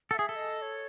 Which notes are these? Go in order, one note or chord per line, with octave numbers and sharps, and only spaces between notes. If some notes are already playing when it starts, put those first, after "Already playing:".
A4 F#5
G#4 E5
A4
D#5
C#5